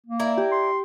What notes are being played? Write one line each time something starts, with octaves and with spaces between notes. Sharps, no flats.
A#3
E4 A#4 D5
G4
C6